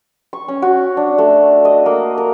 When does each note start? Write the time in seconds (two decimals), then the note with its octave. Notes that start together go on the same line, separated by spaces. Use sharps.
0.33 C#6
0.48 C#4
0.62 F#4
0.97 D4
1.18 A3
1.65 D#5
1.86 A#3
2.18 A#4